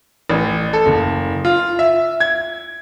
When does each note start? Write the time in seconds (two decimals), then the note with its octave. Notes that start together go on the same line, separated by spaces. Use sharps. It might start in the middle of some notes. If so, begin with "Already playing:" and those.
0.30 A1
0.73 A4
0.86 F#1
1.45 F4
1.79 E5
2.20 G#6